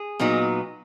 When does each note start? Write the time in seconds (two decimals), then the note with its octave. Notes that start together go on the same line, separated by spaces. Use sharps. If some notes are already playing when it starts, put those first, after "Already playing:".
Already playing: G#4
0.20 A#2 F#3 B3 D#4